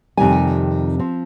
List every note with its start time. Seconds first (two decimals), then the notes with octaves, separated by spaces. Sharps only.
0.17 F2 C3 D#3 G3 G#5
0.99 F3 C4